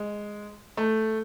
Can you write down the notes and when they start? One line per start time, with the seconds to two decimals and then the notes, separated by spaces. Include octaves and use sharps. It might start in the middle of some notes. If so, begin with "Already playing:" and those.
Already playing: G#3
0.77 A3